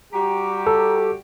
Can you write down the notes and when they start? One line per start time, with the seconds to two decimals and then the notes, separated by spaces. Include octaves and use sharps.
0.13 G3 F#4 G4 A#5
0.67 A4